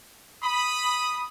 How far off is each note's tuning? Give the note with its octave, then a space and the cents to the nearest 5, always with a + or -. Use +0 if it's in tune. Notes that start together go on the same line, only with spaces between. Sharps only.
B5 +0 D#6 +0